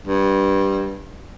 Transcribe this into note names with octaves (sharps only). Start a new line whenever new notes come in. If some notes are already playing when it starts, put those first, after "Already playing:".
G2